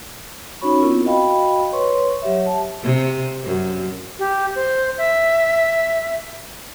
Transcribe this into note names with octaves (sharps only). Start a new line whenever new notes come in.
C#4 D#4 F#4 C#5 B5 C#6
B3 C4 E4 F4 A#4
F#4 D#5 F5 G5 B5
B4 C#5 C6 C#6
F#3 G4 C#5 E5
A5
C3
F#2
G4
C5
E5